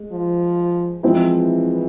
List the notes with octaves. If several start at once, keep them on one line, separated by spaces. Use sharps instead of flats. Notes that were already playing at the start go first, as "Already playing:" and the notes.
Already playing: G#3
F3
E3 F3 G#3 C4 E4 G#4